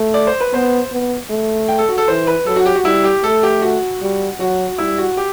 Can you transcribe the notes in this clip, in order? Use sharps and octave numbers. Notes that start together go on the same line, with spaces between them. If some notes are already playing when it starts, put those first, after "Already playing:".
Already playing: A3
D5
C5
B4
B3 C5
B3
A3
G5
A4
F#4
A4
E3 C5
B4
F#3 A4
F#4
G4
F#4
G3 E4
G4
A3 A4
G4
F#4
G3
F#3 F#4
G3 E4
F#4
G4